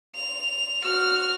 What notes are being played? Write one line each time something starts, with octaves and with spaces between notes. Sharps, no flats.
F7
F#4 F6